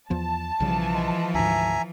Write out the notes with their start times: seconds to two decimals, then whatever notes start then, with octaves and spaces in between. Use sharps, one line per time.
0.10 E2 F3 B3 A5
0.60 B1 C#3 E3 F3 G3
0.93 G#3
1.34 D2 G#2 E5 G#5 A#5